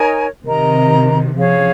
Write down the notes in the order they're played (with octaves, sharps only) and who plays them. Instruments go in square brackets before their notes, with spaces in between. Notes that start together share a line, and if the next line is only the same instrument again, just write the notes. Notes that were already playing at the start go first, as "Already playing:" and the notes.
Already playing: [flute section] D#4 A#4 C#5 G#5
[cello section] C3 D#3 [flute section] A#4 D#5 A#5
[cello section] C#3 F3 [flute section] G#4 C#5 F5